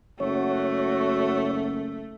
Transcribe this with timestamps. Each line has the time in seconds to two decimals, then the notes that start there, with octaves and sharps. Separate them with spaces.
0.20 F#1 A3 F#4 C#5